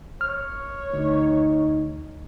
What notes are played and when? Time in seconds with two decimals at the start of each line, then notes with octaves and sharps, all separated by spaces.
0.21 C#5 F6
0.93 D2 D#4